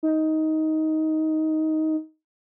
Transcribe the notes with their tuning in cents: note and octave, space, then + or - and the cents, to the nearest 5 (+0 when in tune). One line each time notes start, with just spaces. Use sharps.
D#4 +15